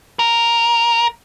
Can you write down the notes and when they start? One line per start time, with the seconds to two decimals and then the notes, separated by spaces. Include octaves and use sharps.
0.19 A#4